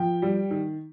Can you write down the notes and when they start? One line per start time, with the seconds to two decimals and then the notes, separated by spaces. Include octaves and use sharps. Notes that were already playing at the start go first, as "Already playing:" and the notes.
Already playing: F3 G5
0.22 G3
0.51 D#3